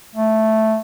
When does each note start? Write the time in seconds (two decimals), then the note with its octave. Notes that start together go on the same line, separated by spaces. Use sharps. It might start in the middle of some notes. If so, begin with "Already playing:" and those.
0.15 A3